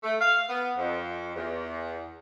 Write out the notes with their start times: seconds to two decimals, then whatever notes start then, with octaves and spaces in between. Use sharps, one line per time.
0.03 A3
0.20 F5
0.49 B3
0.77 F2
1.35 E2